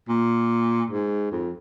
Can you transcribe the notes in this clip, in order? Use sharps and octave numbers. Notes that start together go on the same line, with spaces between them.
A#2
G#2
F2